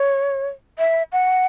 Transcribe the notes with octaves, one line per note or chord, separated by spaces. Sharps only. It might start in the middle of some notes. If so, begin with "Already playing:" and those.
Already playing: C#5
E5
F#5